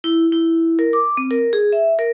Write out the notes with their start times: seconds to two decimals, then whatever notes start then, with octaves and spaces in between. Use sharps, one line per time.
0.04 E4
0.32 E4
0.79 A#4
0.93 D6
1.17 C4
1.31 A#4
1.53 G#4
1.72 E5
1.99 A#4